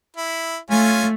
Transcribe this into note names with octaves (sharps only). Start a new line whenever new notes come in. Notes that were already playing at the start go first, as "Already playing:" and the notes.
E4
A3 C#4 F4 G#5